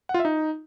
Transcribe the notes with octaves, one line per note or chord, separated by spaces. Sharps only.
F#5
F4
E5
D#4